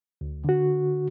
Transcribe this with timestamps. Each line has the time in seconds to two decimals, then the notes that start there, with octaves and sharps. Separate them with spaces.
0.21 D2
0.45 D3 F#4